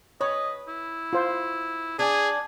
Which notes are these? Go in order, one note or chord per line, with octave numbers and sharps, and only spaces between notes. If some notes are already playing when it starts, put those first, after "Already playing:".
B4 C#5 D#5
E4
F4 C5
D4 G#4 G#5